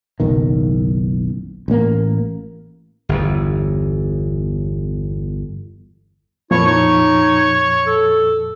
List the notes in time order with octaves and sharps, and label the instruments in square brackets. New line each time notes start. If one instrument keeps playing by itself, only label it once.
[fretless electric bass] F#1 B1 D#3
A1 A#3
[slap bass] G1 E2
[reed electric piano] F2 A#2 F3 [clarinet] E4 [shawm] C#5
[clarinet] D#4 [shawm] C#5
[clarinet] A4